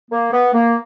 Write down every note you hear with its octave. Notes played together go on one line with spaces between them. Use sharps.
A#3
B3
A#3